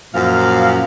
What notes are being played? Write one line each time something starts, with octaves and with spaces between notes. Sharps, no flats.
F#2 A#2 F3 F5